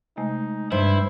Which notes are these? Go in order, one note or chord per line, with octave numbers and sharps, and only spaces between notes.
C3 G#3 A3 D#4
G2 E4 C5